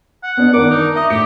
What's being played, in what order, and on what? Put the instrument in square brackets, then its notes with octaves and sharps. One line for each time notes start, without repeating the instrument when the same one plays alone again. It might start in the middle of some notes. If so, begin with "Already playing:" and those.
[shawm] F#5
[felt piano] B3 D4 D#5
[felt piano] D#3 D4 A#4 [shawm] D6
[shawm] D#4
[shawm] D#5 [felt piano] E5
[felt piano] A2 C#7 [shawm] G4